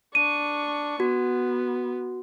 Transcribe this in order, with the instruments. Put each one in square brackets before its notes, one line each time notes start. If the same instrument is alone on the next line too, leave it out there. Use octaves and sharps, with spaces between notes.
[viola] D4 C#6 [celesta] D#7
[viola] B3 [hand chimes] F#4